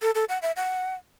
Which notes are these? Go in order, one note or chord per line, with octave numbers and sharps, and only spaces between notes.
A4
A4
F#5
E5
F#5